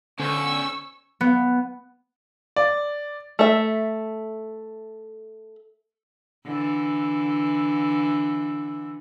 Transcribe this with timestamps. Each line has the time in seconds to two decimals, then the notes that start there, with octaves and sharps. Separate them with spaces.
0.20 D3 C#4 C5 C#5 C#6 E6
1.21 B3
2.56 D5
3.39 A3 E5
6.45 D3 E3